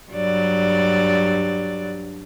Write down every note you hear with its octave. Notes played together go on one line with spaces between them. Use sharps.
G2 F#3 D5